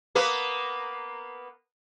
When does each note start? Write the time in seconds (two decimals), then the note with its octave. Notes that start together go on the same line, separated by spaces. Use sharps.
0.15 A#3 B3 B4